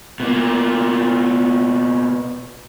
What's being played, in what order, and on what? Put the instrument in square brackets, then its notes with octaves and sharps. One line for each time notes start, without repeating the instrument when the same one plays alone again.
[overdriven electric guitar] B2 A#3